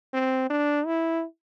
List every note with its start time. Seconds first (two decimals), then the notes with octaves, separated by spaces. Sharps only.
0.14 C4
0.50 D4
0.86 E4